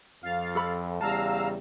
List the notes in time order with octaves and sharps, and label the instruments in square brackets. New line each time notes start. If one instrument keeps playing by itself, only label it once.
[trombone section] F2 [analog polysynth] F5 A6
[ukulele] A4 B5
[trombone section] E2 C#3 G3 [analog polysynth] F5 A#5 E6 [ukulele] A5